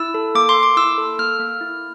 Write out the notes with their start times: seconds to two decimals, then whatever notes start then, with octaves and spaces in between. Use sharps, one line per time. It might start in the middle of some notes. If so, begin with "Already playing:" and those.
Already playing: E4 E6
0.14 A4
0.35 A#3 D6
0.49 C6
0.56 A#3
0.63 D6
0.77 E4 E6
0.98 A4
1.19 A#3 F6
1.39 A#3
1.61 E4